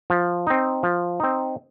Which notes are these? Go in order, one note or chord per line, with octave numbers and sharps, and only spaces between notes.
F3
C4 D#4
F3
C4 D#4